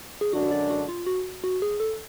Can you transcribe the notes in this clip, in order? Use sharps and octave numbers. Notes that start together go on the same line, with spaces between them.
G#4
F#2 D3 G#3 D4 F#4
D5
F#4
F4
F#4
F#4
G#4
A4